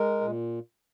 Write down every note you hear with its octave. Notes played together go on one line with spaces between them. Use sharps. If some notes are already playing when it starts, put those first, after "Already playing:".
Already playing: G#3 A#4
A#2